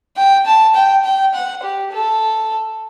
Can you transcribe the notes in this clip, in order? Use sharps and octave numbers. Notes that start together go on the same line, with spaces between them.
G5
A5
G5
G5
F#5
G4
A4